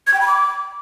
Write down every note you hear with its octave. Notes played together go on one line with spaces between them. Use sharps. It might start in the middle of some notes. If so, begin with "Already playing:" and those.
G#6
G5
B5
D6